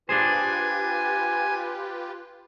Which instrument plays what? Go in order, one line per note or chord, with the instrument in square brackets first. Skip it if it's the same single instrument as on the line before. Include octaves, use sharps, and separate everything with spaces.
[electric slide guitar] D4 G#4 C5 [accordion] F4 G4 B4 [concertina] G#5